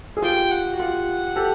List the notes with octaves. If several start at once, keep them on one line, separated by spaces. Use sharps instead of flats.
G#4
F4 G4 G5
F#5
F#4
F4 G4 F#5
G4 A4